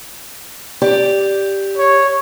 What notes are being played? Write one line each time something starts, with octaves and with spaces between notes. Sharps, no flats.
G4 D5
C#5